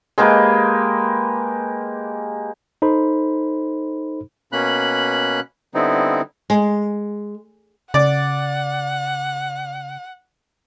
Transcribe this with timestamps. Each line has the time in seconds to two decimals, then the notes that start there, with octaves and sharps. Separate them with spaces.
0.18 G#3 A#3 G4 B4
2.82 D#4 A4 C5 B5
4.52 B2 A#3 C#4 B5 F#6
5.74 D3 G3 B3 C4 D#4 E4
6.50 G#3
7.94 C#3 D5 F#5